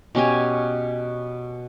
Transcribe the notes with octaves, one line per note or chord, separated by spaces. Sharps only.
B2 C#4 G4 G#5